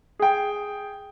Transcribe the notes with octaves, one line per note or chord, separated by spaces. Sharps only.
G#4 G5